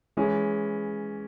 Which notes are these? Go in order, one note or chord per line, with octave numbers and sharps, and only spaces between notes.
E3 G#3 C#4